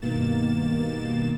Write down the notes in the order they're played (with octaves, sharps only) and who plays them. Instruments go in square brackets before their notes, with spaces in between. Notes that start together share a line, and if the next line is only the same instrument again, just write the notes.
[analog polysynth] G2 B2 D#3 A#3 A6 E7